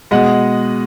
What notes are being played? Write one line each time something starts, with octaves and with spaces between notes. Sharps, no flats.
B2 G#3 D#5 F#5